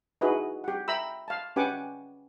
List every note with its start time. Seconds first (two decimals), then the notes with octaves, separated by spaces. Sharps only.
0.21 D#4 E4 F#4 G#4 B4
0.64 G4 F#5
0.88 E5 G5 A#5 B5 E6
1.28 F5 A5
1.56 C#4 G4 B4 F#5 G#5 D6